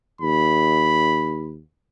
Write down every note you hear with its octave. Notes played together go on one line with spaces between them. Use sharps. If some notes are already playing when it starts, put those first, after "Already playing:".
D#2 B5